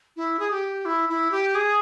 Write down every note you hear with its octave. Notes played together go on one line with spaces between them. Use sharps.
E4
G#4
G4
E4
E4
G4
G#4